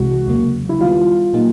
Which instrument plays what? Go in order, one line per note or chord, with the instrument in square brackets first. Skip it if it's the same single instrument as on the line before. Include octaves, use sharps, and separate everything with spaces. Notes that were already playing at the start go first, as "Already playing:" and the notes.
Already playing: [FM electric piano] C2 C3 E3 G#3 [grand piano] F#4
[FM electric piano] E2 C#3 F#3 A#3
[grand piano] E4
[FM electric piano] D#3 G3 B3 [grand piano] F4
[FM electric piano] A#2 F#3 A#3 D#4 G4